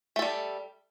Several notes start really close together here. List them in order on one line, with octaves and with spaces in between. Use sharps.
A3 A4 G3